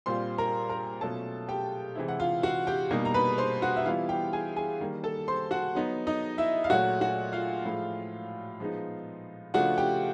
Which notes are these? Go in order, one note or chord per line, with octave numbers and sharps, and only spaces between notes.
A#2 G3 C4 F4 C5 C6
A#4 A#5
A#4 A#5
B2 F#3 A3 C#4 F4 A4 A5
G4 G5
C3 E3 G#3 C4 E4
F#5
F4 F5
F#4 F#5
G4 G5
B2 G3 A#3 D#4
A#5
B4 B5
C5 C6
F#4 F#5
E5
E3 G3 B3 E4 F4 F5
G4 G5
G#4 G#5
G#4 G#5
D#3 G3 A#3
A4 A5
C5 C6
F#4 F#5
F#3 B3 D#4
D#4 D#5
E4 E5
F5
A#2 F#3 A3 F#4 F#5
F#4 F#5
F4 F5
A2 F3 G#3
F3 G#3 B3 D#4
C#3 F3 A3 D4 F4 F#4 F#5
G4 G5